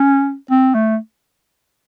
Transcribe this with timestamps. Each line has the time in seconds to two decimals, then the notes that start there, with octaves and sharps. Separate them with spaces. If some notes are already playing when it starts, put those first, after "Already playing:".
Already playing: C#4
0.51 C4
0.75 A3